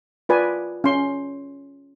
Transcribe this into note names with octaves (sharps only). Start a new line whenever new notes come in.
F4 B4 D5 G#5
C#4 C6